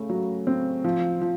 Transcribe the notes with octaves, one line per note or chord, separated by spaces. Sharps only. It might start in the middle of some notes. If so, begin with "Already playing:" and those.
Already playing: C#3 A3
F#3
C4
F3
F3